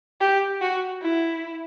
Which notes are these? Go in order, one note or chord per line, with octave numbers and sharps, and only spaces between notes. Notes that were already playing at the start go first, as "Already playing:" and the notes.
G4
F#4
E4